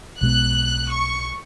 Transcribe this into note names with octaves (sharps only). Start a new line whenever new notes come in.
B1 B2 G#3 B3 F#6
C#6